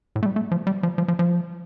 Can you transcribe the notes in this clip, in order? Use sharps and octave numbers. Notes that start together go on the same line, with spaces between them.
A2
A3
G3
A3
F3
G3
F3
F3
F3
F3